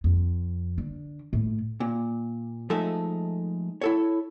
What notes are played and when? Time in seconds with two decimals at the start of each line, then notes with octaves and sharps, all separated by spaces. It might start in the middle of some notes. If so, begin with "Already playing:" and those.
0.04 F2
0.78 D3
1.33 A2
1.80 A#2
2.70 F3 G#3 A3 D#4 A4 E5
3.81 E4 A4 C#5